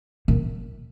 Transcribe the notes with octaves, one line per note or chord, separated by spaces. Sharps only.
A#2